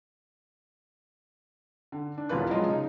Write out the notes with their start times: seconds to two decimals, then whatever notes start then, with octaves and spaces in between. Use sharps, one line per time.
1.92 D3
2.18 D4
2.29 E1 A1 E3 F4 B4 F#6
2.50 F3 F#3 G#3 F4 D#5
2.68 C#3 D#4